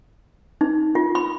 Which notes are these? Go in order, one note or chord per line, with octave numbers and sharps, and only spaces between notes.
D#4
F4
B5